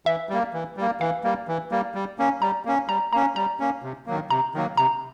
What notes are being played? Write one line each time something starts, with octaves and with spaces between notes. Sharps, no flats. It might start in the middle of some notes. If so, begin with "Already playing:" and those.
E3 E5
G3 A#3
E3
G3 A#3
E3 F5
G3 A#3
E3
G3 A#3
G3
A#3 C#4
G3 A#5
A#3 C#4
G3 A#5
A#3 C#4 A#5
G3 A#5
A#3 C#4
C3
D#3 F#3 A#3
C3 A#5
D#3 F#3 A#3
C3 A#5